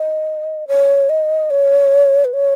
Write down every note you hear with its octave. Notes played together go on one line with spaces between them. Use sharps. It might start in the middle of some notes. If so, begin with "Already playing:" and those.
Already playing: D#5
C#5
D#5
C#5
B4
C#5